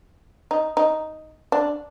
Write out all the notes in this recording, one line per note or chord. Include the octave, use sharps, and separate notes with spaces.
D#4
D#4
D4